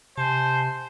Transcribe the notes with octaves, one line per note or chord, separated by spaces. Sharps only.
C3 C5 G#5 A5